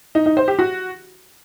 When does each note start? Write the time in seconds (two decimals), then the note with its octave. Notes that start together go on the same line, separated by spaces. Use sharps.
0.15 D#4
0.26 D#4
0.37 C5
0.48 G4
0.59 F#4